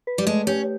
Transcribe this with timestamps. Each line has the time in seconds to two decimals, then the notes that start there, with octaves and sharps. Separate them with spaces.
0.07 B4
0.18 G3
0.27 G#3 A3
0.47 C#4 G4